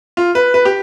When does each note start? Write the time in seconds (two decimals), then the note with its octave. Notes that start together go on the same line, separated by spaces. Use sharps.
0.17 F4
0.35 B4
0.54 B4
0.65 G4